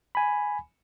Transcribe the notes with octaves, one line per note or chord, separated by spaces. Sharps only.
G#5 B5